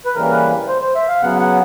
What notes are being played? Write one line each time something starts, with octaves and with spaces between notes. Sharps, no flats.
B4
C#3 E3 G3 A#3 A#4
B4
C5
C5
E5
F5
C#3 F#3 B3 F#5
F#5